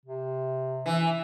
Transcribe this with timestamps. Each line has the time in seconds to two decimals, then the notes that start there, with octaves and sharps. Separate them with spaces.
0.06 C3
0.86 E3